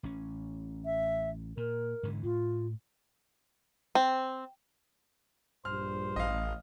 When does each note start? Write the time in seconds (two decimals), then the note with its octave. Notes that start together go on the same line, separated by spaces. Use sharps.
0.03 A1 C#4
0.85 E5
1.57 A#2 A#4
2.03 G#2 D3 E3
2.24 A2 F4
3.95 C4
5.65 A#1 G2 C5 F6
6.16 A1 D#5 F5